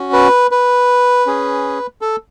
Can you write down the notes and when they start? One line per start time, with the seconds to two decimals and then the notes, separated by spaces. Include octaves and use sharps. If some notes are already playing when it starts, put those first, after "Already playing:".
Already playing: C#4 F#4
0.13 B4
0.51 B4
1.26 C#4 G#4
2.01 A4